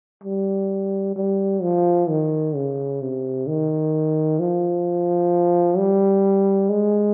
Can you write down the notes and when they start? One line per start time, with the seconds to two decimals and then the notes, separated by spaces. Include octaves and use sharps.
0.24 G3
1.16 G3
1.62 F3
2.09 D#3
2.55 C#3
3.02 C3
3.47 D#3
4.40 F3
5.77 G3
6.70 G#3